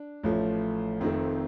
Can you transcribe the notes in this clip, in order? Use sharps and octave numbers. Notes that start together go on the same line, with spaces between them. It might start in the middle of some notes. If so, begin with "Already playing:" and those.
Already playing: D4
A1 A2 F3 A3
F1 F2 D#3 A3 C4